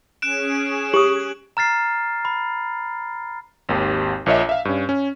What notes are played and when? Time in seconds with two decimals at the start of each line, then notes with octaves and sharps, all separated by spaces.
0.22 C#4 G#4 F#6 D7 E7
0.94 G4 D#6 F#7
1.57 A#5 F6 A6 C7
2.25 B5
3.69 G#1 D#2 G4
4.26 A#1 A#2 C#5 D#5 E5
4.49 E5 F5
4.65 G2 C#4
4.89 C#4